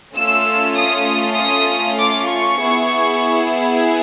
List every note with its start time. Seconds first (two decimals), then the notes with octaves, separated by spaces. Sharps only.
0.15 A3 C#4 F4 E6
0.77 D#6
1.38 D#6
1.98 D6
2.28 C#6
2.60 B3 E4 G#4